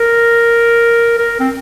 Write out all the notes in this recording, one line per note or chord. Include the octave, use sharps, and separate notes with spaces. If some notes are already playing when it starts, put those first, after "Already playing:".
Already playing: A#4
A#4
C4